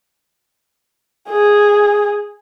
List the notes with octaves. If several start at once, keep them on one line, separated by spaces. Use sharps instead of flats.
G#4